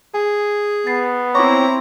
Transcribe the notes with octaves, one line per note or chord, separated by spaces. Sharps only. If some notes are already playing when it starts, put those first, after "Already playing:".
G#4 G#5
B3 A6 C7
C4 E4 C#5 A#5 C#6 D6